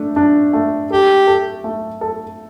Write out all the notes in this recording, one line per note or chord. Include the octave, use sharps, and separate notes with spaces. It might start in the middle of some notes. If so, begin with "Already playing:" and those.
Already playing: A3 D4
D4
A3
G4 A4
A4
A3
A4